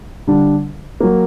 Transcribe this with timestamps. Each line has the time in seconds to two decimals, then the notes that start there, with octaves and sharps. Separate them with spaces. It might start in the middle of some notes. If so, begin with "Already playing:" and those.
0.27 D3 G3 D4
1.00 F#3 A#3